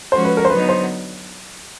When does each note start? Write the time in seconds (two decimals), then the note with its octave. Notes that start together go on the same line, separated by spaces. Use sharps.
0.12 F3 G#3 C#4 F#4 C5
0.24 B4
0.37 A#4
0.45 C5
0.50 D3 F#3 B3 D#4 B4
0.69 C5